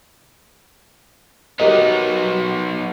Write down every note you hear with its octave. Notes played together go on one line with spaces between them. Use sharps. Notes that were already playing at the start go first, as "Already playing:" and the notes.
B3 D#4 F#4 G4 A#4 D#5